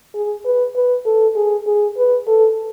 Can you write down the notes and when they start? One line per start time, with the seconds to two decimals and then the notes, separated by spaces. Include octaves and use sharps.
0.14 G#4
0.45 B4
0.76 B4
1.06 A4
1.36 G#4
1.67 G#4
1.97 B4
2.27 A4